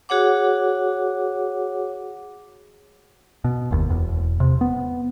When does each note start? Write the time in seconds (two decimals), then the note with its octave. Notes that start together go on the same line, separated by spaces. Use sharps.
0.09 F#4 G#4 C#5 F#5 D6
3.44 B2
3.71 F#1 D#2
3.90 E1 E2
4.40 C3
4.61 B3